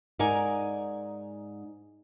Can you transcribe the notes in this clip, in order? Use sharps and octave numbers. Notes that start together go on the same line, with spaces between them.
G#2 D#4 A#4 D5 G#5